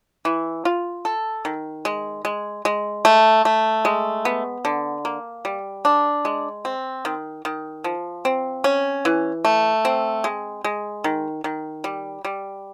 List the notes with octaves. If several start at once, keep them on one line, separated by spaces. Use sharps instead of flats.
E3
F4
A4
D#3
G#3
G#3
G#3
A3
A3
G#3
B3
D3
A#3
G3
D4
G#3
C4
D#3
D#3
F3
C4
C#4
E3
A3
C4
G#3
G#3
D#3
D#3
G3
G3